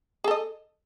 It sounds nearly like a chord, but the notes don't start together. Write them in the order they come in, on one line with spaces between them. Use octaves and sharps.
G#4 A4 D#5